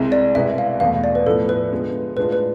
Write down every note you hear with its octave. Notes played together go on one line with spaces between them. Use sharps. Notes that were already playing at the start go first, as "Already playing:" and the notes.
Already playing: C2 C3 G#3 C4 E4
D5
C2 B2 G#3 B3 E4 E5
F5
E2 B2 A3 F5
D5
B4
A2 F3 B3 A4
B4
D3 G#3 B3 F4
A2 G#3 D4 F4 B4
B4